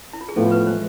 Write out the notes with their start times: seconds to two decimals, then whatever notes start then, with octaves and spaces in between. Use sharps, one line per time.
0.13 E4
0.21 F4
0.28 G#4
0.36 A2 F3 B3 F4 A4
0.51 B4
0.67 E3 G#3 C5